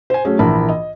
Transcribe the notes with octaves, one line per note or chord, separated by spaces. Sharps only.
C5 G#5
F#3 A3 C#4 G#4
A#1 E3 A#4 A5 B5
D#5